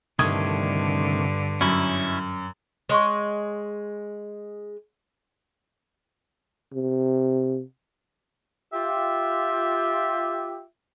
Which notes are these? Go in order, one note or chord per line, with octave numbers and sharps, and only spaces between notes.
C2 G2 D3 D#3 A3 D#6 G#6
F#2 C#4 D#4 E4
G#3 C#5 C6 C#6
C3
F4 G4 E5